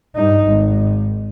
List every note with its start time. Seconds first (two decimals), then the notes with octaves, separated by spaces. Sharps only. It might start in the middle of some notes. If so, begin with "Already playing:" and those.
0.16 G2 D#4
0.46 G#1